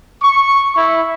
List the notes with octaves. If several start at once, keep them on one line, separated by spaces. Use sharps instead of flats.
C#6
E4